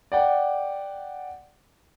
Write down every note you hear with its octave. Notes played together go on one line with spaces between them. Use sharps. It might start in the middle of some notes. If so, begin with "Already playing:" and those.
D5 F#5 G5